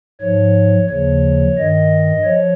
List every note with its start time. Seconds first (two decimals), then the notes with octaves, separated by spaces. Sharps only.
0.21 G#2 F3 C#5
0.90 D#2 C#3 F3 C#5
1.58 G2 D#3 D#5
2.25 F3 C#5